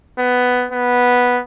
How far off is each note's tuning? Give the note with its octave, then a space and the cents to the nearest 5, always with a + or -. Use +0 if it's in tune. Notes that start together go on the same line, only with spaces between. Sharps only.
B3 +10
B3 -5